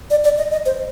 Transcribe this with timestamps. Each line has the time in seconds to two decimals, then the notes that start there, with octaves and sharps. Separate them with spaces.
0.10 D5
0.24 D5
0.38 D#5
0.51 D#5
0.66 C5